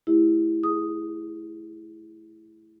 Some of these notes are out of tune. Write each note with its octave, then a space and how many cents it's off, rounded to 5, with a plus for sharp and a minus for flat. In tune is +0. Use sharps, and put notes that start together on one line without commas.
A3 -15 E4 +0 G4 +35
G#4 +0 D#6 +0